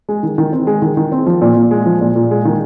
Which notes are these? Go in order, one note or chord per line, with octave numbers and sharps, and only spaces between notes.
G#3
D#3
D#3
C4
G#3
D#3
D#3
C4
F3
A#2
A#2
G#3
F3
A#2
A#2
G#3
D#3